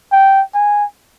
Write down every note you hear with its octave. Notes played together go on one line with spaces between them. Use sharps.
G5
G#5